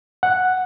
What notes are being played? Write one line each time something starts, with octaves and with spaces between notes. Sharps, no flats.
F#5